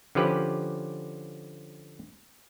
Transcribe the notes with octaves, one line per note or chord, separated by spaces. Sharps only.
D3 F3 C#4 G4 B4